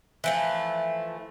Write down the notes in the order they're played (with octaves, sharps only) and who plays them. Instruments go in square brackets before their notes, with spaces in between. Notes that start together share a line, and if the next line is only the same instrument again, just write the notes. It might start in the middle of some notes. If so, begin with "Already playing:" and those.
[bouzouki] E3 F3 A3